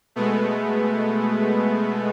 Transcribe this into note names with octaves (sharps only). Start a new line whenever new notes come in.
B2 G#3 A3 B3